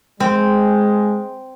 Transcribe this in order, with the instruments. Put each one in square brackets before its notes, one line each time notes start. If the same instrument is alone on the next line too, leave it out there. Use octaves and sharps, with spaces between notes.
[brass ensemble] G#3 [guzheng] C4